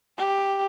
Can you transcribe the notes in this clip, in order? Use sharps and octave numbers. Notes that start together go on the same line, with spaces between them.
G4